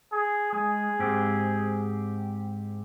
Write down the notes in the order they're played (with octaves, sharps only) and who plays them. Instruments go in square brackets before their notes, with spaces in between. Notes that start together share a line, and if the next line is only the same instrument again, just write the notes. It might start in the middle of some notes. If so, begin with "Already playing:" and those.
[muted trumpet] G#4
[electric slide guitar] G#3 [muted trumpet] G#4
[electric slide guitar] G#2 C4 G4